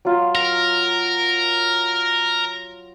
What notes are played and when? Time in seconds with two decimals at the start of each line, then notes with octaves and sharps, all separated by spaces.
0.05 F#3 F4
0.35 A#4